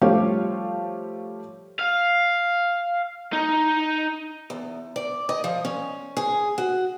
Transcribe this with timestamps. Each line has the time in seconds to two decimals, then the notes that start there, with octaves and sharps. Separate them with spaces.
0.01 F3 G3 A3 G4 C#5 F5
1.79 F5
3.33 D#4
4.50 E2
4.96 D5
5.29 D#5
5.44 F3
5.65 C#4
6.17 G#4
6.58 F#4